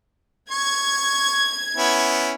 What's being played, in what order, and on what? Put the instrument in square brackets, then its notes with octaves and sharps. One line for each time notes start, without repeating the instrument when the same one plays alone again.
[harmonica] C#6 [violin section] G#6
[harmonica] B3 C#4 E4